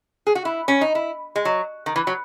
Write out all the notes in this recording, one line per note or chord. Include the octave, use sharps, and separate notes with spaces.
G#4
F#4
E4
C#4
D#4
E4
G#3
F#3
D#3
E3
F#3